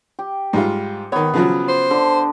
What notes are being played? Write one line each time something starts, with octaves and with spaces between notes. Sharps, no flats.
G4
G#2 G3 F4
D#3 B3 C#5
C#3 F3 F#3
C5
D3